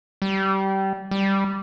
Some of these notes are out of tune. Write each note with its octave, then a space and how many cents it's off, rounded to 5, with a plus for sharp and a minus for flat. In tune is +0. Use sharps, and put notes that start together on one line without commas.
G3 -20
G3 +0